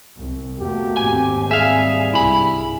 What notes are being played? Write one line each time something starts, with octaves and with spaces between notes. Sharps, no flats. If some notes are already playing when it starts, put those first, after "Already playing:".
C2
E2 A3 A#3 F#4 G4
G#1 D#2 C4 G#5
G3 G#4 E5 F5 G#5
C2 G2 E4 B5